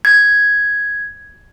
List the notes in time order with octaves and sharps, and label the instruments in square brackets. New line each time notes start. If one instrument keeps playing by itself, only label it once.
[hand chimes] G#6